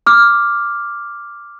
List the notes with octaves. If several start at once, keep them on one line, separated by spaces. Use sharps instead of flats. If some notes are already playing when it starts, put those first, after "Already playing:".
D6 F6